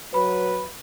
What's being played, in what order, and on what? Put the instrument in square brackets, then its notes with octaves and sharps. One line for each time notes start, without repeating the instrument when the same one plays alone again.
[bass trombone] F#3 [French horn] B4 [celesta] B5